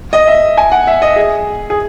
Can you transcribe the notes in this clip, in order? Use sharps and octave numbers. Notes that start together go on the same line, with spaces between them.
D#5
E5
G#5
F#5
E5
D#5
G#4
G#4